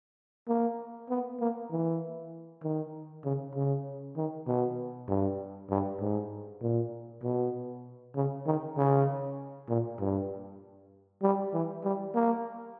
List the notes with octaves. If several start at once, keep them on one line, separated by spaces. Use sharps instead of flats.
A#3
B3
A#3
E3
D#3
C#3
C#3
D#3
B2
G2
G2
G#2
A#2
B2
C#3
D#3
C#3
A#2
G2
G3
E3
G3
A#3